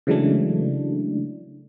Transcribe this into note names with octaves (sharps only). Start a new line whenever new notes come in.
C#3 E3 F#3 G#3 A3 D4